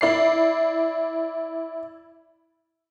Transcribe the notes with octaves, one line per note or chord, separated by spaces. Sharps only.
E4 D5 C7